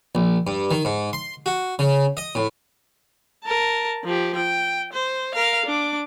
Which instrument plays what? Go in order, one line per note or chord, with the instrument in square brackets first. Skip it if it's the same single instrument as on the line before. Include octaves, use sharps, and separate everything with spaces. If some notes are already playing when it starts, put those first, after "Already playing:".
[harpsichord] A#1
G2
D#3
G#2
C6
F#4
C#3
D#5
A2
[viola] A#4 A5
F3 G4
G5
C5
A#4 F5
D4 D6